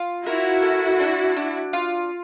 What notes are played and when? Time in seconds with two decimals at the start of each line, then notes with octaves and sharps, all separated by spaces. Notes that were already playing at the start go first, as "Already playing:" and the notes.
Already playing: F4
0.25 E4 F#4 A#4
0.62 A3
1.00 D4
1.36 D4
1.73 F4